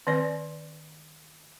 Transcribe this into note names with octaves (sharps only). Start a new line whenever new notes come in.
D#3 C4 B4 D5